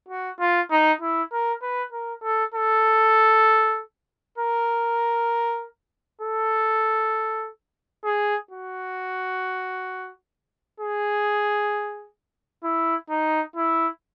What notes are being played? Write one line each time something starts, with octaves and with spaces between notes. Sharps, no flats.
F#4
F4
D#4
E4
A#4
B4
A#4
A4
A4
A#4
A4
G#4
F#4
G#4
E4
D#4
E4